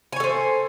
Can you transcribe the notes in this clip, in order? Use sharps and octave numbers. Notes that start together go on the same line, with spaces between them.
A4 C5 C#5 G#5